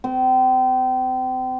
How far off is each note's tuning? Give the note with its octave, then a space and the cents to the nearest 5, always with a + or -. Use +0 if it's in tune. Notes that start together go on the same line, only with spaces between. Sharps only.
C4 -35